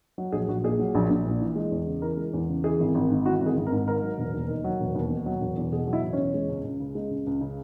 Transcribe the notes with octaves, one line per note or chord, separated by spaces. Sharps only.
F#3
A#1 G#4
A#1 F#4
A#2 G#4
F#3
A#1
A#1
A#2
E3
G#3
E2
C#3
E3 A#4
G#3
E2
C#3
E3 G#4
G#1
G#1
G#2
E3 F#4
G#1
G#4
G#1
A#4
G#2
D#3 A#4
F#3
E1
D#2
D#3
F#3
E1
D#2
B2
F#3
E1
E2
B2 G#4
F#3
E4
E1
E2 C#4
G#3
C#2
C#2
C#3
G#3
C#2
C#2
C#3